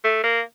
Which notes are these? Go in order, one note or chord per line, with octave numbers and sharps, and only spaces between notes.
A3
A#3